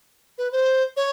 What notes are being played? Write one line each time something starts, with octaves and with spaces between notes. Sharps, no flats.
B4
C5
C#5